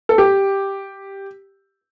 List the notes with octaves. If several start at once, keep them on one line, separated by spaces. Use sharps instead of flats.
A4
G4